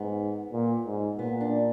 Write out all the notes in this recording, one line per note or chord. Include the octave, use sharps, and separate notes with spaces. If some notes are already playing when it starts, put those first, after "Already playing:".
Already playing: G#2 B3
A#2
G#2
A#2 B3
D4